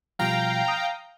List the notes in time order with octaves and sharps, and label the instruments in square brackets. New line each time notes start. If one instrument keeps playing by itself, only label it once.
[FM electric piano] B2 F3 G3 [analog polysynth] F5 G5 A#5
[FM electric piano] D#6